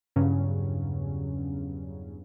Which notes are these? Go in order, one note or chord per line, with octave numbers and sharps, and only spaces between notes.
E2 G2 C#3 F#3 C#4